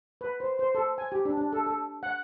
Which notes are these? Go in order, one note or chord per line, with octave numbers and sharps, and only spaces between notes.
B4
C5
C5
A4
G#5
G4
D4
D4
A4
A4
F#5